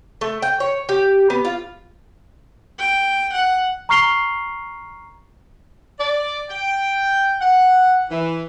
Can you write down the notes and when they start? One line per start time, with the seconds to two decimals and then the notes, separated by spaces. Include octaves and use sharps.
0.21 A3
0.42 G5
0.60 C#5
0.89 G4
1.30 B3
1.45 F4
2.78 G5
3.32 F#5
3.89 A#5 C#6 F6 C7 F7 G7
5.99 D5
6.50 G5
7.41 F#5
8.10 E3